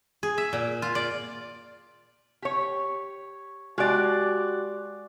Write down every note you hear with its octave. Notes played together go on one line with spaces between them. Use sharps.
G#4
E5
A#2
F4
D5
G4 C#5
G#3 F#4 G4 D5 F#6